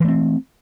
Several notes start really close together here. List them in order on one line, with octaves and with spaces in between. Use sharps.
E3 A3 C4